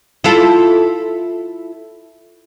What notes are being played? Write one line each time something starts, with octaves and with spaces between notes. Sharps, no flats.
E4 F4 A4